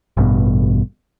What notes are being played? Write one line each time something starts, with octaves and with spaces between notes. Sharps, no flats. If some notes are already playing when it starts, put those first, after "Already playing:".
A1 G2 B2